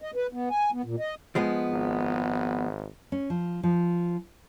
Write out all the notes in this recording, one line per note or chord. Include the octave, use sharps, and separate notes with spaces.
D#5
B4
B3
G#5
B3
A#2
D#5
F3 G#3 B3
G#1
C#4
F3
F3